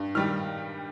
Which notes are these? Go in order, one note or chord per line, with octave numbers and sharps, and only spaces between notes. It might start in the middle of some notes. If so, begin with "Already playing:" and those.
Already playing: G2
D#3 G3 F6